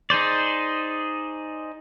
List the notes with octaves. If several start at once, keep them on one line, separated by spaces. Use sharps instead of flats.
D#4 G#4 C5 D5